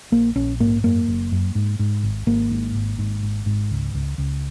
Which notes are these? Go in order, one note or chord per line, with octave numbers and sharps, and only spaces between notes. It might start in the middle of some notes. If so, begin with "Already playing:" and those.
A#1 A#3
A#1 C#4
G#2 A#3
F#2 A#3
F#1
F#2
G#2
G#2
G#1
G#1 A#3
G#2
G#1
G#2
G#1
G#2
C#2
C#2
C#2